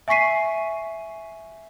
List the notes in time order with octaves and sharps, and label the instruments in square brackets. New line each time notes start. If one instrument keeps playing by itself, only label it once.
[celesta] E5 G#5 C#6 B6 C7 D#7